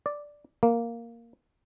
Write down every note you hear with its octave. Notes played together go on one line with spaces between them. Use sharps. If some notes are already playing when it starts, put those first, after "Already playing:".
D5
A#3